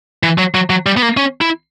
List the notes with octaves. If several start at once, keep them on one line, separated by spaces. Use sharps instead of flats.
E3
F#3
F#3
F#3
G3
B3
A#3
C#4
E4